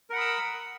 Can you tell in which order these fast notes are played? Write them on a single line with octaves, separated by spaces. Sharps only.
A#4 F#5 B5 D#6 E6